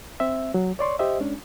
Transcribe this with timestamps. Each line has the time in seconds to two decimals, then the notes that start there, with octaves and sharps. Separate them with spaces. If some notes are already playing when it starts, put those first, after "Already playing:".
0.20 C4 E5
0.54 F#3
0.79 C#5 D5 C6 C#6
0.99 G4 C5 D#5 E5
1.20 G#3 C#4 D4